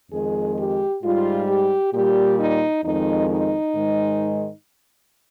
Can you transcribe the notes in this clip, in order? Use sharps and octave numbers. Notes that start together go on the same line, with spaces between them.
F2 D#3 G#3 G#4
G4
G#2 G3 F4
G4
A#2 G3 G4
D#4
F2 D#3 G#3 D#4
D#4
G#2 D#3 G#3